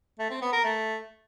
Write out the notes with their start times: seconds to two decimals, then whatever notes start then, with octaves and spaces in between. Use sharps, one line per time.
0.19 A3
0.30 C4
0.42 B3
0.53 A#4
0.64 A3